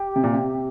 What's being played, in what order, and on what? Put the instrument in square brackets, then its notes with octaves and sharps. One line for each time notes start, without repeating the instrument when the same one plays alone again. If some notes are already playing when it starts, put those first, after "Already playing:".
Already playing: [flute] G4
[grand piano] C3
A#2
C3